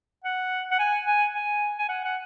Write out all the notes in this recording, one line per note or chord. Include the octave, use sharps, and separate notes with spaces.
F#5
F#5
G#5
G#5
G#5
G#5
F#5
F#5